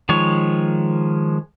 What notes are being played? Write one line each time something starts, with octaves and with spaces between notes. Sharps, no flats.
D#3 F3 G#3 C#5